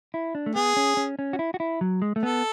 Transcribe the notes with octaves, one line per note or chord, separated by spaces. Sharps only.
E4
D4
A3
B3 G#4
C#4
C#4
C#4
F#4
E4
F#4
E4
F#3
G#3
A3
B3 A4